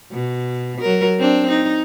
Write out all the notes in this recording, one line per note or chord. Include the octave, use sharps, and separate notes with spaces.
B2
F#3 A#4
C4 D4
D#4